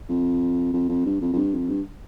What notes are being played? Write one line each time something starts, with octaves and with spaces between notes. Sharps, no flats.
F2
F2
F2
G2
F2
F2
G2
F2
G2